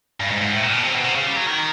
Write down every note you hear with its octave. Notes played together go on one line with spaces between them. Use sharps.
G2
G#2
G#2
A2
A#2
B2
C3
B2
C3
C#3
G3
F#3
D#3